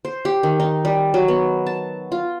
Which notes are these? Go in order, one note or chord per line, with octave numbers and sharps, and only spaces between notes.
C5
G4
D#3
D#4
G3
F#3
B3
A5
F4